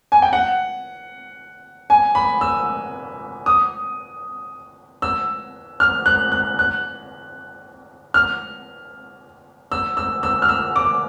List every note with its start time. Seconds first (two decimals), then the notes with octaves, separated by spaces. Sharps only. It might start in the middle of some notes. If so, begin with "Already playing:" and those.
0.12 G#5
0.22 G5
0.33 F#5
1.90 G#5
2.15 B5
2.41 E6
3.46 D#6
5.02 E6
5.80 F6
6.06 F#6
6.32 F#6
6.59 F#6
8.14 F6
9.72 E6
9.97 E6
10.23 E6
10.42 F6
10.49 E6
10.76 D6